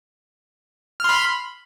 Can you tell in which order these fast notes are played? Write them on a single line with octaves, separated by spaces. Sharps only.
F6 C6 B5